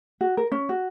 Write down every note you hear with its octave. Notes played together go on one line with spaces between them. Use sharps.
F#4
A#4
C#4
F#4